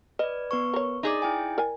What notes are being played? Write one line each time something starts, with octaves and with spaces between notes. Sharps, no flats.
B4 D5 D#5
B3 B4 C#6
A#4 C#5
D#4 G#4 D5
E4 G5 G#5
A#4 D5 G#5